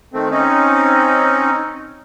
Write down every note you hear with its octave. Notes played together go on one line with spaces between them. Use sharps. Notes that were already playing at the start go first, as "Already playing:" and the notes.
D#3 A3 C4
C4 C#4 D#4